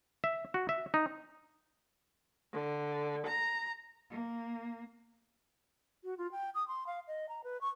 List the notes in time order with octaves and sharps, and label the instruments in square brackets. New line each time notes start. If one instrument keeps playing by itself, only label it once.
[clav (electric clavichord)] E5
F#4
E5
D#4
[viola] D3
A#5
[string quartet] A#3
[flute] F#4
F4
G5
D#6
C6
F5
D#5
A#5
B4
C#6